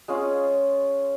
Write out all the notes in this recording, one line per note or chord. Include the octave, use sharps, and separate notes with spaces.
G#3 C#4 F4